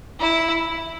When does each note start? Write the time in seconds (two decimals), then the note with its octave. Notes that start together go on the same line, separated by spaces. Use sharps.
0.20 E4